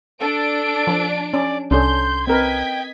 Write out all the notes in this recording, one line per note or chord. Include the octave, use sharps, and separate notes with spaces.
D4 A4 D7
F3
C#4 D5
C2 C#4 D4 A4 C6 G6
C4 A#4 B4 D#5 G5 G#6 B6